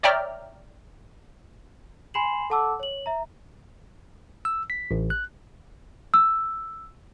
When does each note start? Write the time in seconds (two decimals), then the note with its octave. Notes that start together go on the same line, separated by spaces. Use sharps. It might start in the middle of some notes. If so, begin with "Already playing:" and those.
0.03 C#5 D5 E5 G5 A#5 F6
2.14 G#5 B5 C6 C7 E7 F#7
2.50 A4 F#5 A5 D6 E6
2.80 C#5 F#7
3.06 E5 A#5
4.45 E6
4.70 B6
4.91 A1
5.10 F#6
6.14 E6